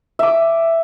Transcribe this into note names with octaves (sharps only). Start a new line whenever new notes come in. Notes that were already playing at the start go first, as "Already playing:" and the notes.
E5 D6